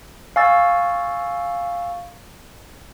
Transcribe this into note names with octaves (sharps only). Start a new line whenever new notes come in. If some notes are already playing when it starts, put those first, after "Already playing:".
F5 G#5 C#6 E6 A6